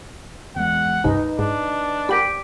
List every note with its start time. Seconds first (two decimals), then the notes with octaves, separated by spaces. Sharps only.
0.56 E2 G#3 F#5
1.04 C#2 G2 C3 D#4 B4 D#5
1.39 G#2 D4
2.09 G4 A#4 F#5 B5